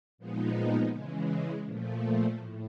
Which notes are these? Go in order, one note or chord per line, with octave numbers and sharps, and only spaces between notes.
A#2 F3 G#3 B3 D#4
C#3 E3 G#3
A#2 F3 A3
A2